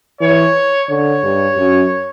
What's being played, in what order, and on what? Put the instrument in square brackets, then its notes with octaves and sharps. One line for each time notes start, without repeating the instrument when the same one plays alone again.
[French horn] E3 [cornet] C#5
[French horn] D3 [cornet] C#5
[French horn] G2
F#2